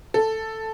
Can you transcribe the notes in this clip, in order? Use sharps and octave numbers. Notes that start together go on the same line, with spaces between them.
A4